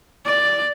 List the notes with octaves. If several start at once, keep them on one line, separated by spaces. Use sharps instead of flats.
D5